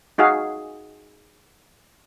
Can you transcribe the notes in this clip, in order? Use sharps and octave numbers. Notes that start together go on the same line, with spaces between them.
D#4 F#4 G#4 F5